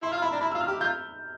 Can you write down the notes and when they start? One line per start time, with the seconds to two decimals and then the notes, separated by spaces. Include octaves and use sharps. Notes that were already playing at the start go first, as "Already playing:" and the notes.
0.03 E4 C6
0.12 F4 F6
0.22 E4 B5
0.32 D4 A#5
0.41 E4 B5
0.52 F4 E6
0.61 F6
0.68 G4
0.80 F4 G6